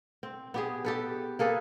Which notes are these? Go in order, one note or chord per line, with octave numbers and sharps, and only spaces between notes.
C4
B3 G4 G#4
G4 A4 B4
A#3 G#4 A4 B4